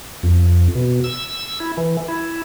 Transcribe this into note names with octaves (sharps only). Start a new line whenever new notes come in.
F2
B2
E6
E4
E3
E4